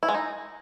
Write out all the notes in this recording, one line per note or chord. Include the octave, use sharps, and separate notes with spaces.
E4
G#3
D#4